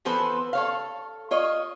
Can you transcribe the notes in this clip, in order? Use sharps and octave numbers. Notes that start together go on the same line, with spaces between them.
E3 F3 B3 A4 B4 C5
A4 C#5 F5
F4 C#5 D#5